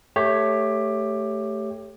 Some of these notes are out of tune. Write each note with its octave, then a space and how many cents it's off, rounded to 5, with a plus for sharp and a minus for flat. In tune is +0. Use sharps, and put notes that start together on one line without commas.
A3 +0 G4 +15 C#5 +0